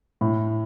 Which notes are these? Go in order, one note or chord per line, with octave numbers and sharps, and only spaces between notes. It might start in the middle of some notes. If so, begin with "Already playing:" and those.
A2